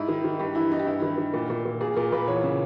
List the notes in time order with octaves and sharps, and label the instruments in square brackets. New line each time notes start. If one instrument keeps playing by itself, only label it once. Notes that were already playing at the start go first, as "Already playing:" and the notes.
Already playing: [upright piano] G#2 E4
D#3
D#3
G2 G4
E3 E4
E3 D#4
G4
G2 E4
D#3
D#3
A#2
A#2
A#2
A#2 G#4
A#2 A#4
A#2 B4
E2 C#5
C#3